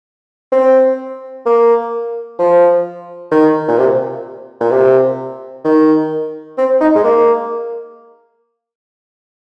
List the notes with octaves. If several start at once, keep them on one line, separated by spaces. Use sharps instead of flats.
C4
A#3
F3
D#3
A#2
C3
A#2
C3
D#3
C4
D#4
G#3
A#3